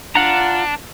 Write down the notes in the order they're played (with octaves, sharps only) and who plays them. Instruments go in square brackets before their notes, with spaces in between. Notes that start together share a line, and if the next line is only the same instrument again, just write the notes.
[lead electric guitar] D4 [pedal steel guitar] F4 F#5 A#5